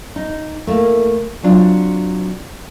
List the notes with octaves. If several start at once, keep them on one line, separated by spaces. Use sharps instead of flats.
D#4
A3 A#3 E4
F#3 C4 D4 F4